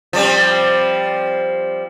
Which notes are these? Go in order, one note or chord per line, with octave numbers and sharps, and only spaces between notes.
F3 G3 C4